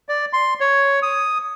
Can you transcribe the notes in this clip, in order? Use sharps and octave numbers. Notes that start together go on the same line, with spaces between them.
D5
C6
C#5
D#6